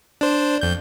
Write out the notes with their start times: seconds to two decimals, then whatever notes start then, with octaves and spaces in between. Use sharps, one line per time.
0.21 D4 C5
0.61 F2 G6